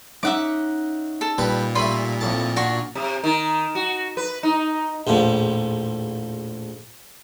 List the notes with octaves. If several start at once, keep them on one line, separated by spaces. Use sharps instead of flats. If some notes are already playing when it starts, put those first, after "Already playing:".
C#4 D#4 E5 F#5 D6
A4
A#2 G3 G4 B4
G3 A3 B4 E5 B5 C6
F2 A2 A5
D4 F#4 C#6
C3
D#3
F#4
B4
D#4
A#1 E2 A2 F3